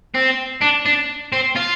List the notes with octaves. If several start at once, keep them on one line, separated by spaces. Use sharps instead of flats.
C4
D4
D4
C4
F4